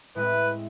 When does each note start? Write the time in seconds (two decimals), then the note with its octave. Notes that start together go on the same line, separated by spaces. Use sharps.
0.15 A2 G#3 C4 E4 B4